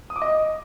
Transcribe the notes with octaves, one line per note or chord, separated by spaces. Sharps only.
D#6
D6
D#5